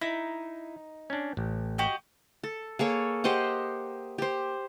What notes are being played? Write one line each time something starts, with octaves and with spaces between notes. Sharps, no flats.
D#4 E4
C#4 D4
A1
F#4 G4 D#5
A4
A#3 G#4 A4 C#5
G4 C5 D#5 F#5
G4 C5